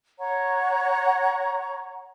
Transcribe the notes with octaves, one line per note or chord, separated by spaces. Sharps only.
C#5 F#5 A#5 C#6